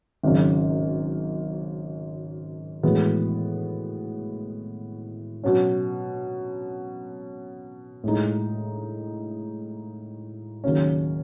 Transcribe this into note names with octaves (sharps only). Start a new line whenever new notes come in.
G#1 F#2 C#3
A2 E3 G#3 B3 F#4
B2 F#3 C#4
A2 G#3 D#4
D#2 C#3 F#3 C#4